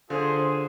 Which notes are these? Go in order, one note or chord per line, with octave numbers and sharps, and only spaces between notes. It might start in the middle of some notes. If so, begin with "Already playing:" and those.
D3 F4 G#4 C5